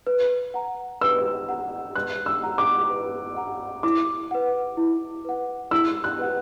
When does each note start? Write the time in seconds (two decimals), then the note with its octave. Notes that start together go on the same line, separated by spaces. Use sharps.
0.07 B4
0.54 F#5 A#5
1.01 B4 E6
1.49 F#5 A#5
1.95 B4 F#6
2.26 E6
2.42 F#5 A#5
2.58 D6
2.89 B4
3.36 F#5 A#5
3.83 E4 D6
4.31 B4 F#5
4.77 E4
5.25 B4 F#5
5.71 E4 E6
6.04 F#6
6.19 B4 F#5